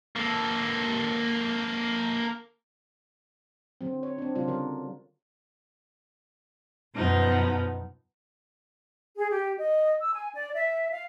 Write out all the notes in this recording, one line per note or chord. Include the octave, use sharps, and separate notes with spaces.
A#3 A4
D3 F#3 C4
C#5
C4 D4
C#3 G3 C4 D4 F4
D3 F#3 A#4
F#2 B2 F3 B3 D#4
G#4
G4
D#5
E6
G#5
D5
E5
F5